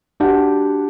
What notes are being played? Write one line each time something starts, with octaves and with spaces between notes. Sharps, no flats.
D4 F#4 G4 F#5